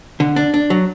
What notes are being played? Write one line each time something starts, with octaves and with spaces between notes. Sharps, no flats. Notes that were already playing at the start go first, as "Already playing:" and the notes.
D3
D4
D4
F#3